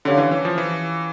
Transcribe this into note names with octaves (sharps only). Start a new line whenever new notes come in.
D3 C#4 G4 C#5 F5
E3
E3
F3
E3